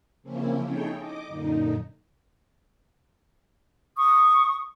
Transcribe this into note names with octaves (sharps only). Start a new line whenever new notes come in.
C#3 F3 A#3 C4 C#4 E4
D#4 E4 G#4 A4 C#5 G5
D#5 D6
F#2 A#2 D3 D#4
C#6 D#6